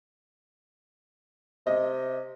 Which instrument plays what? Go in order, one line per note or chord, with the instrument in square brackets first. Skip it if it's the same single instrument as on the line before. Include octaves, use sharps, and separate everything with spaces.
[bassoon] C3 [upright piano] D#5